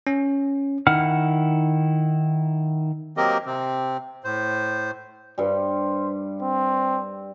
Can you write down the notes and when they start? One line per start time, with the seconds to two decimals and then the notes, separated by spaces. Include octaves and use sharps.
0.07 C#4
0.87 D#3 E4 F#5 F6
3.17 F#3 A#3 C4 G4 A#4 D#5
3.46 C3 C4
4.24 A2 C5
5.38 G2 G3 C5
6.42 C4